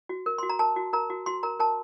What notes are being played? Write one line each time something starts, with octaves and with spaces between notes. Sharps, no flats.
F#4
A#4
F#4 C6
A#5
A#4 A5
F#4
A#4 A#5
F#4
F#4 C6
A#4 A#5
A#4 A5